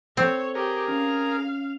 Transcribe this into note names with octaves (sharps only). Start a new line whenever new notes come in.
C4 A4 C#5
G4 G#4 A#4
C#4 F5